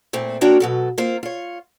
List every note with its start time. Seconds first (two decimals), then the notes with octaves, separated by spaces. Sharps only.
0.13 A#2 A3 C4 E4
0.41 A#3 D4 F#4 A#4 C#5 G5
0.60 B2 F#3 A4
0.98 A#3 C4 F4 C5
1.23 F4 C#5